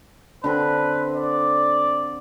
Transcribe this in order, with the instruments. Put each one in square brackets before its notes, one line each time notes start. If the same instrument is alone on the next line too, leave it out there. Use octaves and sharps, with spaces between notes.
[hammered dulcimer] D3 C4 A4 [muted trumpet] B4
[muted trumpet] D5